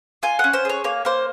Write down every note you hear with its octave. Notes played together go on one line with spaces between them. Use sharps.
F4 G#5
C#4 F#5
C5
G#4 C#5
A#3 C#5
A#3 C5